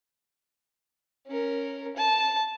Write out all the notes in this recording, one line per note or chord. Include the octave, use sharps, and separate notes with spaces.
C#4 A#4
A5